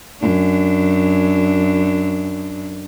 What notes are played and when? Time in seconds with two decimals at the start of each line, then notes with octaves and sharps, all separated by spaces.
0.19 F#2 D4